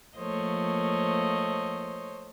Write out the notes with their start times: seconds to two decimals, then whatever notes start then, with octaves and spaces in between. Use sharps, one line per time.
0.17 F3 A3 A#3 C5 C#5 D#5